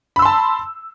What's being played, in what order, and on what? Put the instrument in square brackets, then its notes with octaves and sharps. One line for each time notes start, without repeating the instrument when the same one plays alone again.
[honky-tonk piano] B5
E6
C6
A5